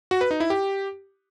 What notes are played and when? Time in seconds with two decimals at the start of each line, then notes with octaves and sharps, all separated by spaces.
0.11 F#4
0.21 B4
0.31 D#4
0.40 E4
0.50 G4